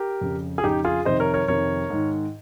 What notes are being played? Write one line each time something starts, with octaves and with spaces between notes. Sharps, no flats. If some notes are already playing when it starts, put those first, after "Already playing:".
Already playing: G4 A#4
F2 C#3
G#4
F2 C#3 D#4 G4
F4 G#4
F2 C3 D#3 C5 D#5
A#4 C#5
A#4 C#5
F2 C3 D#3 A#4 C#5
G#2 D#3